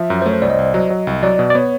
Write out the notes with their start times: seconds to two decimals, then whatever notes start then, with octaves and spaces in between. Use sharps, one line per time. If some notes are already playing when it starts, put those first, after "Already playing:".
Already playing: F3 E5
0.10 F#2
0.22 C5
0.26 A3 C#5
0.34 C5
0.42 C2 D5
0.50 D#5
0.58 C2
0.74 F#3
0.90 F#3
1.07 C2
1.23 F#3 D5
1.39 B2
1.50 D5
1.55 B3 C#5